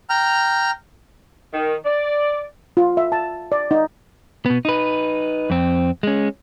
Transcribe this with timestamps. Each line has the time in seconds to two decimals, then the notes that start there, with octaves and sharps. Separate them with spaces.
0.10 G5 A#5 F6
1.53 D#3
1.85 D5
2.77 F4
2.97 E5
3.12 A5
3.52 D5
3.71 D#4
4.46 B2 B3
4.65 D#4 B4
5.50 F2 C4
6.03 G#3 C#4